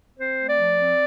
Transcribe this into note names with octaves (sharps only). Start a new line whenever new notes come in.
C4 C5
A3
D5
F3
C4